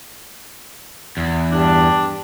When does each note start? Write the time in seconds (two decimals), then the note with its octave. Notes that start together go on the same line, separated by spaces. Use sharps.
1.17 E2
1.51 G2 D4